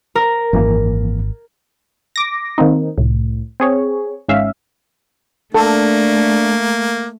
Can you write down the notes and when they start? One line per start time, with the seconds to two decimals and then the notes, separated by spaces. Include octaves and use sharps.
0.15 A#4
0.53 G#1 F#2 E3 A#3
2.16 D6 A#6
2.58 D#3 A#3 C4 D#4
2.98 C2 A2
3.60 C4 G#4 C#5
4.28 G#1 G#2 C#4 E5 F5
5.55 A3 A#3 D4 A4